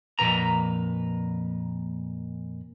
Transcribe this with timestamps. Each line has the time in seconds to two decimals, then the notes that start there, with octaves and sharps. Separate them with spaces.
0.19 F2 A#2 B4 A#5